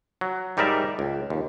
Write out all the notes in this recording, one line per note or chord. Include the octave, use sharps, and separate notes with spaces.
F#3
G#2 G3 D#4 A#4 D5 E5
C#2
D#2